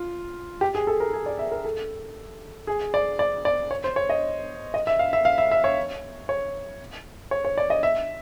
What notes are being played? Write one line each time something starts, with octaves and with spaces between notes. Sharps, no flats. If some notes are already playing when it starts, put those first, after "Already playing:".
Already playing: F4
G4
G#4
A4
A#4
G#4
D5
E5
A#4
A4
G#4
D5
D5
D5
C#5
C5
C#5
D#5
D#5
E5
F5
E5
F5
E5
E5
C#5
C#5
C#5
C#5
D5
D#5
E5